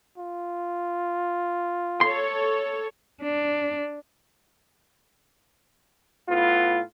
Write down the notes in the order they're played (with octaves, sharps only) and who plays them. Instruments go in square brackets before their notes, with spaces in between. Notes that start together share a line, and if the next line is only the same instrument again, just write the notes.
[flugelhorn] F4
[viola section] A4 C#5 [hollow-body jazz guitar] C6
[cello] D4
[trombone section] A2 B3 F4